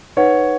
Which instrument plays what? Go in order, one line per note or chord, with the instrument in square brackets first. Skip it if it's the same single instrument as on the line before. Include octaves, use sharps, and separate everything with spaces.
[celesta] D#4 B4 F#5 [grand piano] C#5